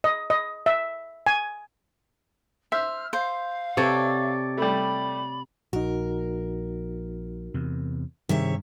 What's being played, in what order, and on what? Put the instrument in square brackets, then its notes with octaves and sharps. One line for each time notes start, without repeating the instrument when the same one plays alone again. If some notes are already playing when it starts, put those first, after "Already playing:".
[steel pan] D#5
D#5
E5
G#5
[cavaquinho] C5 [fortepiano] E5 [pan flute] F6
[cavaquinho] C5 [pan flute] F5
[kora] C3 [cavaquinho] A4 C#5 D5
[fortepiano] G3 A3 [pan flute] B5
[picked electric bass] A#1 [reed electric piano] D#4 F#4 [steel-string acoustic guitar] A#4
[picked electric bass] E2 C3
[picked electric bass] G2 [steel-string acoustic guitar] C3 C#5 E5 [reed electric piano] D#3 G3 G#4